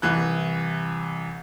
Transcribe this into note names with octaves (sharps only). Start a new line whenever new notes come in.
C2 E3 F#6